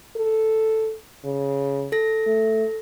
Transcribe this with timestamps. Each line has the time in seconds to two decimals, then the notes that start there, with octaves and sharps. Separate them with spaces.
0.16 A4
1.25 C#3
1.92 A4 A#6
2.27 A3